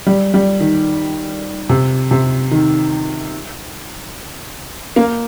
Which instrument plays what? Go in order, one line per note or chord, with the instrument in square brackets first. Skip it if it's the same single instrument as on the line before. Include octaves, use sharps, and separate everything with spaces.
[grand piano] G3
G3
D#3
C3
C3
D#3
A#3